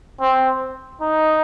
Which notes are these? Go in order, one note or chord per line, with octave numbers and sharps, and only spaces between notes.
C4
D#4